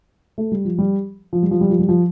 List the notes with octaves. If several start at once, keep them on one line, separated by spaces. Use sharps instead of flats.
A3
G3
F3
G3
F3
G3
F3
G3
F3
G3
F3